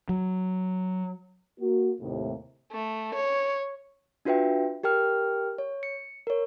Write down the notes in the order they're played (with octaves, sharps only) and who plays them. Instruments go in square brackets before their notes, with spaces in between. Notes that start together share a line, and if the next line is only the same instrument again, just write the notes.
[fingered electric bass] F#3
[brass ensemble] A#3 F#4
D#2 A2 C3
[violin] A3
C#5
[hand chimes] D4 F4 F#4 B4 E5 G5
G4 A#4 G5 F6
C#5
C#7
A#4 C#5